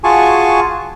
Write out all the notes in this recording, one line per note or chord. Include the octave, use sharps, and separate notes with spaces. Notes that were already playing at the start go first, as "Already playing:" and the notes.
F4 F#4 G#4 G#5 A5 C#6